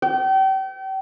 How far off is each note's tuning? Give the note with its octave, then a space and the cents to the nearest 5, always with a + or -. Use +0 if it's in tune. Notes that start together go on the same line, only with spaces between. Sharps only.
G5 -35